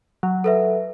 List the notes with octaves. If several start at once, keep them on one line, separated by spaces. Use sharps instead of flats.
F#3
A4 B4 E5